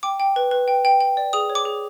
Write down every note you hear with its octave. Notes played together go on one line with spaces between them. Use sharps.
G5 D6
G5
B4
B4
G5
G5
G5
D5
G#4 D#6
C#5
D6
G#4